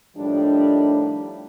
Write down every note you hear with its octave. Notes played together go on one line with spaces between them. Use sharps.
A2 D#3 F3 G3 D4